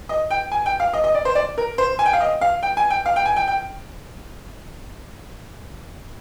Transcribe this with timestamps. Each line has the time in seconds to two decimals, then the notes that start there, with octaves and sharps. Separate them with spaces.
0.09 D#5
0.30 G5
0.52 G#5
0.66 G5
0.80 F5
0.93 D#5
1.04 D#5
1.15 D5
1.25 C5
1.35 D5
1.58 A#4
1.78 C5
1.99 G#5
2.06 G5
2.13 F5
2.20 D#5
2.41 F5
2.63 G5
2.77 G#5
2.90 G5
3.06 F5
3.16 G5
3.25 G#5
3.36 G5
3.48 G5